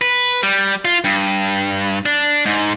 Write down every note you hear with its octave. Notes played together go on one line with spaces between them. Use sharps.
B4
G3
F4
G2
D4
G#2